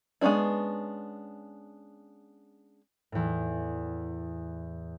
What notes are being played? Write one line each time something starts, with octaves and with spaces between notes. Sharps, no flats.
G#3 B3 C#4 D4 E4
E2 A2